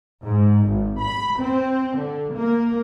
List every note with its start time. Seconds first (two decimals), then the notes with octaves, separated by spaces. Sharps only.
0.24 G#2
0.67 G#1
1.00 B5
1.40 C4
1.98 D3
2.34 A#3